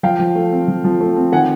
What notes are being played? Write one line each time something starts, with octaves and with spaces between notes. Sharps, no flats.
F3 F5 G5
F3
A3
C4
F3
F3
A3
C4
D#3 F#5 G#5